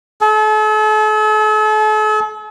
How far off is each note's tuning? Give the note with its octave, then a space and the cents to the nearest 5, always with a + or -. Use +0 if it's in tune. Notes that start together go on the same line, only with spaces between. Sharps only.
A4 -40